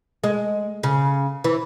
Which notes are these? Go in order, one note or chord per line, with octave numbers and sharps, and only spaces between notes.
G#3
C#3
E3